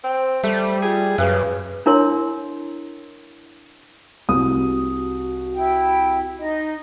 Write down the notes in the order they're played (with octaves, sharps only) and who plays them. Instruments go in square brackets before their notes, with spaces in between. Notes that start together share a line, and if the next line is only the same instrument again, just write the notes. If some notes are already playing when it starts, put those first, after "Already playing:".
[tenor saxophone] C4 [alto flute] C5
[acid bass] G3 [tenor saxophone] A3
[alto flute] F4 [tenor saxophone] G#4
[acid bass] F#2 [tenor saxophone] C#3 [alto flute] B4
[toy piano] D4 E4 A#4 C#5 C6
[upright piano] C2 D#6 [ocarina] F#4
[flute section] E4 G5
D#4 D#5